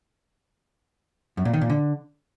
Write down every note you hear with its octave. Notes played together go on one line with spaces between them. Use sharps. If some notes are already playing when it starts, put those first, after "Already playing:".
F#2
A#2
D#3
A#2
D3